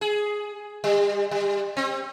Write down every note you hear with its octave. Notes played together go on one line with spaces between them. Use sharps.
G#4
G3
G3
C4